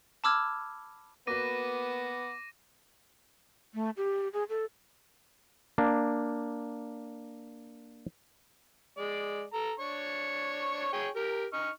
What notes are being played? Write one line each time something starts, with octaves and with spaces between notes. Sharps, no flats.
A5 B5 D6 E6 F6 G#6
A#3 B3 F#4 B4 D6 A#6 D#7
A3
G4
G#4
A4
A#3 D4
G#3 D5
A4 A#5
D4 C#5 C#6
G#4 C#5 G5
G4 A#4
D#4 C#6 F6